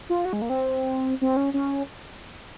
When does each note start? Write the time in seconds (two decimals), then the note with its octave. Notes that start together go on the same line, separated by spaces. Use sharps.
0.10 F4
0.25 F#4
0.33 G#3
0.42 A#3
0.49 C4
1.21 C4
1.37 C#4
1.54 C#4